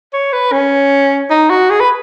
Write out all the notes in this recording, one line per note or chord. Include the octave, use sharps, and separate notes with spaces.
C#5
B4
C#4
D#4
F#4
G#4
B4